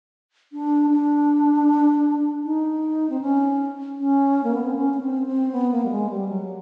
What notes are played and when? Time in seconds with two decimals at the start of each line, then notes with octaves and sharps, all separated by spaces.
0.53 D4
0.91 D4
2.44 D#4
3.10 C4
3.21 C#4
3.99 C#4
4.44 A#3
4.54 B3
4.65 C4
4.75 C#4
4.94 C#4
5.01 C4
5.26 C4
5.52 B3
5.71 A#3
5.85 G3
5.90 G#3
6.10 G3
6.29 F#3